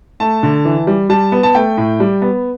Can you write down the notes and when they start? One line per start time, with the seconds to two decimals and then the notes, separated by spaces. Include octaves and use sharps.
0.20 A3 A5
0.43 D3
0.65 E3
0.87 G3
1.09 G3 A5
1.32 B3
1.43 A5
1.55 A3 G5
1.77 A2
2.00 G3
2.22 B3